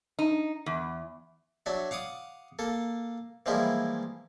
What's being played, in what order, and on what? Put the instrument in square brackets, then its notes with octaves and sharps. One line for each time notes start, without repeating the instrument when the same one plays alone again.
[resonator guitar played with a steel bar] D#4
E2
[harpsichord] F#3 D4 E5
F5 F#5 D6 D#6
A#3 A4
E3 F3 G3 G#3 A#3 E4